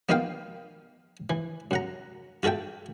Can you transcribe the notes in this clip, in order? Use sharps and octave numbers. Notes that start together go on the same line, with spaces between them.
A#3 B3 D#4 F4 F5 G5
E3
F#2 F#5 A#5
F4 F#4 A4 E5 G5